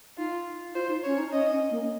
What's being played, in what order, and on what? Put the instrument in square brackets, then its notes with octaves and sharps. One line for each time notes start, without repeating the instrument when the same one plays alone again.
[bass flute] D#4 [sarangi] F4
[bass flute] F4 [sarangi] C5
[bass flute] D#4
[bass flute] C#4 [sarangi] C#5
[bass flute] D#4
[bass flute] C#4 [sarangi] D#5
[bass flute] C#4
A#3